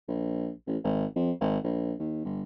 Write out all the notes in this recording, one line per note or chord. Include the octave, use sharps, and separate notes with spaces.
A#1
A1
G#1
F2
G#1
A#1
D#2
G1